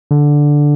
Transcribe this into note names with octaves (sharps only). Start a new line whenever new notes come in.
D3